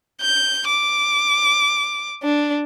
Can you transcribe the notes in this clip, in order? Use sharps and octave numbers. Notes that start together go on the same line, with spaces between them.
G6
D6
D4